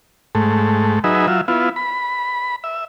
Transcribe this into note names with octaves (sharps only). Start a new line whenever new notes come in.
G#2 A3
F#3 D#4 G#4 B4 E5
F#3 F4 E5
B3 E4 F4
B5
E5